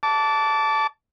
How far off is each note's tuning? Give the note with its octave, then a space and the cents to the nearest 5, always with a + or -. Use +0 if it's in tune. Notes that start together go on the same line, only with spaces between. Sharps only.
A5 +0 D6 -25